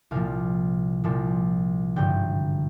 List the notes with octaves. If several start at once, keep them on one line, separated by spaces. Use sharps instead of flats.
C2 A#2 F3 F5
C2 A#2 F3
G#1 G2 D3 G5